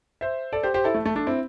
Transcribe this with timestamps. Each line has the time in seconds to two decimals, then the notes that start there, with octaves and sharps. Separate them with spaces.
0.21 C5 E5
0.53 A4 D5
0.63 G4 C5
0.74 G4 C5
0.84 E4 A4
0.95 A3
1.06 A3
1.16 A3 D4
1.27 C4 E4